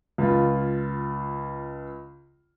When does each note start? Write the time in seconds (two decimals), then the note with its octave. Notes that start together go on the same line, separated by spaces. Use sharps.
0.18 C#2 F4